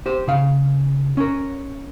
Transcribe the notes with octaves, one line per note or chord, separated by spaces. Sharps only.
G4 C5
C#3 F5
C#4 A#4